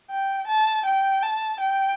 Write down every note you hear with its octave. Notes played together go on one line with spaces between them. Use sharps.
G5
A5
G5
A5
G5